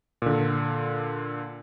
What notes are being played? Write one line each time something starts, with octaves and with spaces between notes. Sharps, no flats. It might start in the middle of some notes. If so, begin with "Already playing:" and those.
A#2 D3